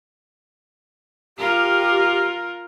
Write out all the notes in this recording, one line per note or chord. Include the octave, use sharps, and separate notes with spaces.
F4 G4 A#4